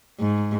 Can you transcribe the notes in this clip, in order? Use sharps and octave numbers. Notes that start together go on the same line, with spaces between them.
G#2